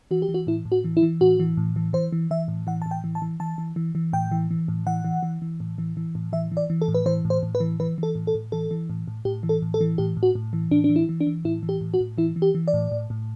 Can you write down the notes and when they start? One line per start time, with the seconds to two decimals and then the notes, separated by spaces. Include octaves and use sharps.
0.11 E3 F#4
0.22 G4
0.29 E3
0.34 F#4
0.47 A2 E4
0.65 A2
0.72 F#4
0.84 E3
0.97 E4
1.03 E3
1.21 A2 F#4
1.40 E3
1.57 A2
1.76 E3
1.93 E3 C5
2.12 E3
2.31 E3 E5
2.48 A2
2.67 E3 F#5
2.82 A2 A5
2.91 G5
3.04 E3
3.15 A5
3.22 E3
3.40 E3 A5
3.58 E3
3.76 E3
3.95 E3
4.13 A2 G5
4.32 E3
4.51 E3
4.68 A2
4.86 E3 F#5
5.05 E3
5.23 E3
5.42 E3
5.60 A2
5.78 E3
5.97 E3
6.15 A2
6.33 E3 E5
6.52 E3
6.57 D5
6.70 E3
6.82 A4
6.88 A2
6.94 B4
7.06 E3 C5
7.25 A2
7.30 C5
7.43 A2
7.55 B4
7.60 E3
7.80 E3 B4
7.98 E3 A4
8.15 A2
8.27 A4
8.35 A2
8.52 E3 A4
8.71 E3
8.90 A2
9.08 A2
9.25 A2 G4
9.43 E3
9.49 A4
9.62 A2
9.74 A4
9.81 E3
9.98 A2 G4
10.17 A2
10.23 F#4
10.35 A2
10.53 E3
10.71 A2 D4
10.84 D4
10.90 E3
10.96 E4
11.09 E3
11.21 D4
11.27 E3
11.45 A2 E4
11.63 E3
11.69 G4
11.81 A2
11.94 F#4
12.00 A2
12.18 E3 E4
12.36 E3
12.42 G4
12.55 E3
12.68 D5
12.74 A2
12.92 A2
13.10 A2